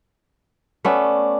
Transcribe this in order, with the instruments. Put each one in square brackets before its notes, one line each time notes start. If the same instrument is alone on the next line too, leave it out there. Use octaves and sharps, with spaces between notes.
[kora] A3 B3 C#4 [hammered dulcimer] D5